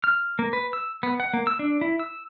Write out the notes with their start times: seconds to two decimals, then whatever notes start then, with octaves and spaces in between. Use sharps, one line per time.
0.04 F6
0.39 A#3
0.53 B4
0.73 E6
1.03 B3
1.20 F#5
1.33 A#3
1.47 E6
1.59 D4
1.81 E4
1.99 E6